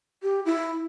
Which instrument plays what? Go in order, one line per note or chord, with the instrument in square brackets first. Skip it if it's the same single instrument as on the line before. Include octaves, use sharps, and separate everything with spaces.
[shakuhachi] G4
E4